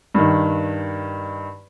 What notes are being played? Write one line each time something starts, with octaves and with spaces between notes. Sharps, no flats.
G2 D#3